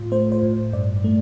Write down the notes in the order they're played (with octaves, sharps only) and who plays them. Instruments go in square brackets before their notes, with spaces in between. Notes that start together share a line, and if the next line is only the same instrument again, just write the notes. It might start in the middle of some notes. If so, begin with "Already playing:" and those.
Already playing: [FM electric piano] A2 F4
A3 C5
C5
A2
G2 D5
A3